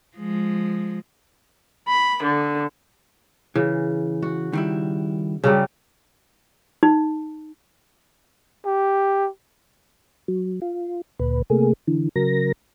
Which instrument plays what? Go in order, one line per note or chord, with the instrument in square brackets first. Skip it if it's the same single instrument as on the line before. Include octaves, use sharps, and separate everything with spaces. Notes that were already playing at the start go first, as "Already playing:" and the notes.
[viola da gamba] F3 G#3
[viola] B5
D3
[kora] C#3 [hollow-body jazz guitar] E3
[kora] F#4
[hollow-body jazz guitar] D#3 G3 E4
[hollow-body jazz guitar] G2 [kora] C#3 F#3 G3
[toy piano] D#4
[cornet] G4
[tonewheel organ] F#3
F4
D2 A#2 B4
C3 A3 A#3 G#4
D3 E3
C#3 F#3 A#4 A#6